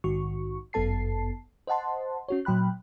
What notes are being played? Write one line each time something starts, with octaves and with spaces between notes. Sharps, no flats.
A#1 G#2 D#3 F#4 C#6
G1 F#2 B3 A4 A5 C7
C5 D#5 F#5 A5 C6
C#4 F#4 C#5
A#2 F#3 G5 B5 F#6